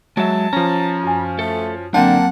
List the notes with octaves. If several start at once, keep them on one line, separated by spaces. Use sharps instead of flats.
F#3 G#3 E5 A5
F3 C#4 A#5
F#2 G#5
A3 A4
D3 F#3 A#3 C4 D4 F#5 G5 A5